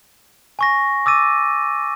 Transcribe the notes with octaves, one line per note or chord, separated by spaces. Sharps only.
G#5 C#6 A#6
D6 E6 A6 D#7